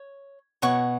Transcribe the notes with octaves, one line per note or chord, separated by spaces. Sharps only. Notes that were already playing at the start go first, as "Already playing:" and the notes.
Already playing: C#5
B2 C#5 F#5 C#6